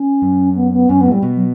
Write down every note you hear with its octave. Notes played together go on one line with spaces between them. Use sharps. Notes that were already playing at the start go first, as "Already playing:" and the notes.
Already playing: C#4
F#2
B3
B3
F#2 C#4
A2 B3
G3
B2
F#3